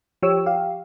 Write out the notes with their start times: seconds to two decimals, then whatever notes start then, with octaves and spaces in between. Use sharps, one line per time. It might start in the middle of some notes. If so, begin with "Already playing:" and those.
0.22 F3 G4 C#5 E6
0.46 G4 F5